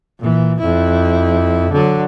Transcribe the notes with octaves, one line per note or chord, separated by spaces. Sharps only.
A#2 E3
F2 E4
D3 F#3